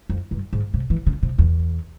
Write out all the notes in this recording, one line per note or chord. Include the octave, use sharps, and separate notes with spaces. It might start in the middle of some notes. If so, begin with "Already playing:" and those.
F2
G2
G#2
C3
E3
C#3
C3
E2